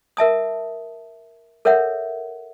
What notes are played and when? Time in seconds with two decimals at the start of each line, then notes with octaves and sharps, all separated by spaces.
0.17 A#4 E5 A5 D#6
1.65 A4 A#4 C#5 E5 F#5